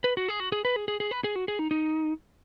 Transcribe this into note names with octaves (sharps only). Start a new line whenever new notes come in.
B4
F#4
G#4
F#4
G#4
B4
G#4
G#4
G#4
B4
G#4
F#4
G#4
D#4
D#4